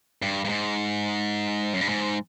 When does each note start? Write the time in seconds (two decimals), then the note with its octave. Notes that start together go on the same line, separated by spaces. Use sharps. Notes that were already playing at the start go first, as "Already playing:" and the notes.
0.22 G2
0.45 G2
0.49 G#2
1.74 F#2
1.81 G2
1.89 G#2